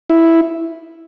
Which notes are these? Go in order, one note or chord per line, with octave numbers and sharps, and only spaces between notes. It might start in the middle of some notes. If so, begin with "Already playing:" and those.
E4